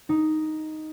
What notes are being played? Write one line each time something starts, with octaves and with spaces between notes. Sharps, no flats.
D#4